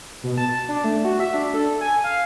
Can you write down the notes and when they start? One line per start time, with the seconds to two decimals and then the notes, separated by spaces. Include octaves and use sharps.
0.23 B2
0.38 A5
0.69 D4
0.84 A3
1.05 F#4
1.20 E5
1.34 D4
1.54 A4
1.81 G#5
2.04 F5